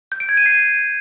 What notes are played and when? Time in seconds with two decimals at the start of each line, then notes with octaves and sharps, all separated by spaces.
0.12 G6
0.20 D7
0.29 G#6
0.37 D#7
0.46 C7